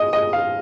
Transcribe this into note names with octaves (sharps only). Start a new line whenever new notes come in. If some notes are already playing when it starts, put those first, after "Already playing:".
Already playing: D#5
D#5
F5